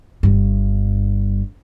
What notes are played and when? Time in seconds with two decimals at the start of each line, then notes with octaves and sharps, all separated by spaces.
0.23 G1 G2